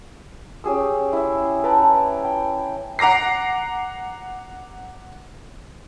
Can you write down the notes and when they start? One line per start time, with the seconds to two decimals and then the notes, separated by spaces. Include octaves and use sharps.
0.64 C#4 G4 G#4 E6
1.13 E4 E5
1.64 B4 G5 A5 A#5
1.83 E4
2.24 G5
2.99 F#5 A#5 D6 A#6 C7